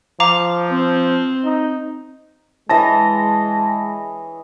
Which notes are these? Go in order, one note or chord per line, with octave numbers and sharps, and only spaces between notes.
F3 F5 A#5 D6
C4
D#4
E3 G#3 C#5 D#5 A5 A#6